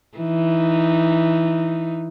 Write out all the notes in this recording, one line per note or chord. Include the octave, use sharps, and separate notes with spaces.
E3 D#4